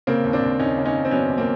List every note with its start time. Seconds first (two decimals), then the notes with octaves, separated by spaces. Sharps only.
0.07 C#3 A#3 C4
0.24 D#2
0.33 C4 D4
0.41 D#2
0.59 D#2 C#4 D#4
0.77 C#3
0.85 C#4 D#4
0.95 D#2
1.05 C4
1.11 F#3 B3 C#4
1.29 D#2
1.38 A#3 C4